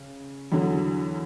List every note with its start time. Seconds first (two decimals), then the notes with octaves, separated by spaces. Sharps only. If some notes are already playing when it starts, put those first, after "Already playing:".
Already playing: C#3
0.52 E2 D3 F#3